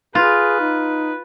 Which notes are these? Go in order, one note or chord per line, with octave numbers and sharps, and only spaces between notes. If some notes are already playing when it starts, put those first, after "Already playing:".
F4 G#4 B4
D#4